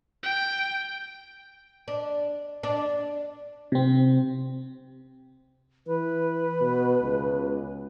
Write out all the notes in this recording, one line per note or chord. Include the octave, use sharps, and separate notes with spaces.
G5
D4
D4
C3 C4
E3 B4
B2
C#2